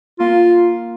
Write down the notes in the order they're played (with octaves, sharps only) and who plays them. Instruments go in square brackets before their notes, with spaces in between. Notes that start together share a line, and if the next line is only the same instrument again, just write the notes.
[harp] A#3 [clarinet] F4